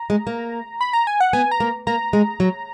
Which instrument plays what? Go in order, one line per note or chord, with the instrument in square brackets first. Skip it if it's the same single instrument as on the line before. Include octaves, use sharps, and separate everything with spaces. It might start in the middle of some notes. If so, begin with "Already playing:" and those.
Already playing: [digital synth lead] A#5
[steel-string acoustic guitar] G#3
A#3
[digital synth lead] B5
A#5
G#5
F#5
[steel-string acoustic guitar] B3 [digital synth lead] G#5
[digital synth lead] A#5
[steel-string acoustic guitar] A#3
[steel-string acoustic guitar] A#3 [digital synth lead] A#5
[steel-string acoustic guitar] G#3
F#3